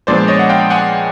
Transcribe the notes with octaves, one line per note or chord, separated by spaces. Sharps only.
A#2 F3 G#3 B3 D4 C5 D5
C#5 D#5
F#5
F5 G5
F#5 G#5